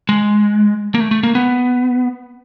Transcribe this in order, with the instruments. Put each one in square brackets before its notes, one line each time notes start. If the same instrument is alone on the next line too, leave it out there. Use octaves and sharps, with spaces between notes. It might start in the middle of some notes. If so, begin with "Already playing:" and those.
[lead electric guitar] G#3
A#3
A3
A3
A#3
B3